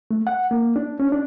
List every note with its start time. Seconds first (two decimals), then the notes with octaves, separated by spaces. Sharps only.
0.11 A3
0.27 F#5
0.51 A#3
0.76 D4
1.00 C#4
1.12 D4